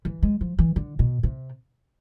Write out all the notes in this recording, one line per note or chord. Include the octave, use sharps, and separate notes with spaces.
E3
G#3
F3
E3
D3
B2
C3